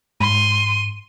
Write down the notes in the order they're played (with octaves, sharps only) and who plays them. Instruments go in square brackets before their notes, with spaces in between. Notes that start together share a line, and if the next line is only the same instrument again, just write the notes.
[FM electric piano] G#2 [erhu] C6 [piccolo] D#7